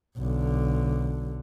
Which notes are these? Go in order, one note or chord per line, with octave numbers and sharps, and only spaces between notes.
B1 D3